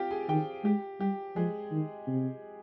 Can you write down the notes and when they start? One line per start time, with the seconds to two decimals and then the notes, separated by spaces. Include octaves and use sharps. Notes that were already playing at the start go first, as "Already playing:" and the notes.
Already playing: C4 F4 G4 F5 G5
0.11 G#4 G#5
0.29 D#3 G4 G5
0.64 G#3 G4
1.00 G3 G4
1.36 F3 G#3 G#4
1.71 D#3
2.07 C3